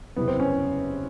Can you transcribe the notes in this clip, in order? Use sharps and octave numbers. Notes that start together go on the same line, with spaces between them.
F#1 E2 C3 E3 B3
C4
C#4